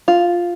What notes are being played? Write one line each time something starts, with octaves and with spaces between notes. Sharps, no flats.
F4